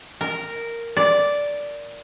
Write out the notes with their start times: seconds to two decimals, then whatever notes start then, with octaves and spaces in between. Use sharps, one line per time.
0.21 A#4
0.97 D5